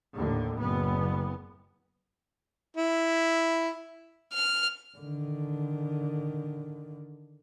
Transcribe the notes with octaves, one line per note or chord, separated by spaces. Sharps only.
D#2 A2 D3
F#1 B3
E4
F6
D3 D#3